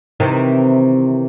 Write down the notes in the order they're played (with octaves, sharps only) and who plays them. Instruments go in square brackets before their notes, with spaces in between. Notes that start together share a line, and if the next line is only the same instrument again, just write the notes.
[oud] C3 D#3 E3